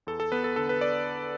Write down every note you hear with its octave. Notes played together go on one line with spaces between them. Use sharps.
E2 A4
A4
B3 B4
A4
D3 A4
B4
D5